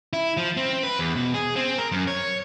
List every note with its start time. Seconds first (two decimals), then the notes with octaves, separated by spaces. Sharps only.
0.13 E4
0.37 F3
0.57 C4
0.83 B4
0.99 E2
1.16 B2
1.34 G#4
1.56 C4
1.78 A#4
1.92 F#2
2.07 C#5